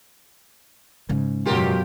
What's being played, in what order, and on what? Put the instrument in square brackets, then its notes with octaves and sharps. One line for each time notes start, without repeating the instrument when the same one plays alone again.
[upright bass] G#2 C#3
[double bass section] F#2 B2 F#3 [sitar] F4 G4 A#4